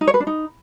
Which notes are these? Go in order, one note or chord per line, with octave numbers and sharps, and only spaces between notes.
D#4
C#5
B4
D4
D#4